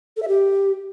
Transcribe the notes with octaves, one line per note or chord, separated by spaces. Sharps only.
A4
E5
G4